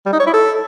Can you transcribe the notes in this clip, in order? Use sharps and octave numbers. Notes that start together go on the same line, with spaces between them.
G3
D#4
C#5
E4
A4